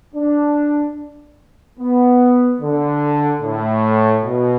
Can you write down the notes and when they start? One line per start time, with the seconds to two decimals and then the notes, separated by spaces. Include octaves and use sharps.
0.15 D4
1.79 B3
2.61 D3
3.42 A2
4.24 B2